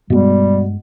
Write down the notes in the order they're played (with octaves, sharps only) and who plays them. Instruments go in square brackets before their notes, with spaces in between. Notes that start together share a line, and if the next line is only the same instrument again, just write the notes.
[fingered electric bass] G2 G#3 [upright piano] B2 [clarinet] G3